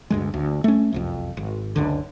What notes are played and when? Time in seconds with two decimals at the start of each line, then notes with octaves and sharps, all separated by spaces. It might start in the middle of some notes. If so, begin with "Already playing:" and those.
0.10 D2 G2 F3 G#3
0.34 D2
0.64 A3 C#4
0.92 F#1 C2 F2
1.37 G#1
1.76 F#1 C#2 D3